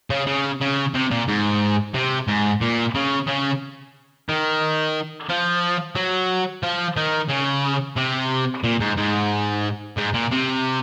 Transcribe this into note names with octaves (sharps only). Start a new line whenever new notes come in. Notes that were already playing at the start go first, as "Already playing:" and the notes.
C#3
C#3
C#3
C3
A#2
G#2
C3
G#2
A#2
C#3
C#3
D#3
F3
F#3
F3
D#3
C#3
C3
A#2
G#2
G#2
G#2
A#2
C3